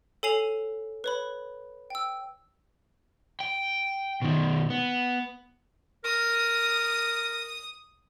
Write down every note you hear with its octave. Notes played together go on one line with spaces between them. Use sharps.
A4 C#5 G#5 C7 F7
B4 C#5 B5
G5 E6
G5
B2 D#3
B3
A#4 D#6